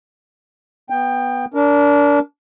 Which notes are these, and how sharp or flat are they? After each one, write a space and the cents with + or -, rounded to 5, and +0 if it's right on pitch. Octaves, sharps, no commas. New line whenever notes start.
B3 -5 G5 +20
D4 -25 A#4 +0